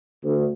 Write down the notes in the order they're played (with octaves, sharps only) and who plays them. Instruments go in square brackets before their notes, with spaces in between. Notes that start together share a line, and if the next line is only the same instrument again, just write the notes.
[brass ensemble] D2